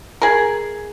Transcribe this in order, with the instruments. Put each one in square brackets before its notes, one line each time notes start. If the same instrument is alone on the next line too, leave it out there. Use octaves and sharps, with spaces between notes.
[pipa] G#4 A#4